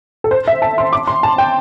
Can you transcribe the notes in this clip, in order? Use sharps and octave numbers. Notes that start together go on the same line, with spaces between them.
A4
C5
E5
A5
C6
D6
C6
A5
G5